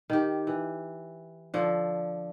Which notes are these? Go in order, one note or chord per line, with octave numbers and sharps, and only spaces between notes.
D#3 G4
E3
D3 F3